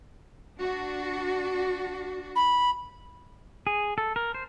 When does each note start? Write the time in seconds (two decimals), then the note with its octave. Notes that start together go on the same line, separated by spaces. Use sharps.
0.59 D4 F#4
2.35 B5
3.67 G#4
3.98 A4
4.16 A#4
4.34 C5